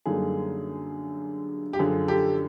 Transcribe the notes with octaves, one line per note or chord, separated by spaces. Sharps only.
F#2 D3 G3 A#3 D#4 G#4
G4
F#2 D3 F3 G#4
G4 A4